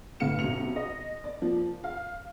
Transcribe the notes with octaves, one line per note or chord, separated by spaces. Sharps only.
G1 A2 F5 C#7 E7
B1 F#2 C3 C#7 F7
D#5
D5
F3 A#3
F5